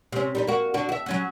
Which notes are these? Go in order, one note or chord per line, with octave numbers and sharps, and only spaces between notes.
C3 C#4
G3 D4 D#4
A#3 F#4
D3 D4 F#4
F#4 E5
F#3 C#4 F#4